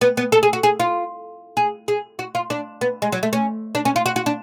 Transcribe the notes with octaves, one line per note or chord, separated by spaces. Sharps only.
B3
B3
A4
G#4
F#4
G#4
F4
G#4
G#4
F#4
F4
D4
B3
G#3
F#3
A3
C#4
D4
C#4
F4
F#4
F#4
D4